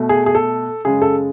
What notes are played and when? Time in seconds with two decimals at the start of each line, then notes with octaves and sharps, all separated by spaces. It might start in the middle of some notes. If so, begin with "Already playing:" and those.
Already playing: B2 A3
0.09 G#4
0.26 G#4
0.35 A4
0.85 F#2 C#3 G#3 G#4
1.02 A4